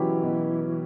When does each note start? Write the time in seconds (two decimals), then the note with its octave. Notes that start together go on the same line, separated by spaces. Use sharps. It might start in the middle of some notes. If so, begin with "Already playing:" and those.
Already playing: B2 E3 F#3 C#4 E4 G4
0.23 B2